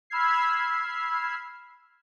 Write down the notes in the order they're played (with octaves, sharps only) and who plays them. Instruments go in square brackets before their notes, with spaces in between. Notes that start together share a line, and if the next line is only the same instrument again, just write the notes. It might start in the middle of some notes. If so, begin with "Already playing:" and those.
[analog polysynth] B5 E6 F6 G#6 C7